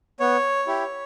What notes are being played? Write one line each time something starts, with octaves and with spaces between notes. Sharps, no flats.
B3 C#5
E4 G4